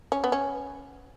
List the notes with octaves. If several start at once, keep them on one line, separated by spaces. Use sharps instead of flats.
C#4
B3
C#4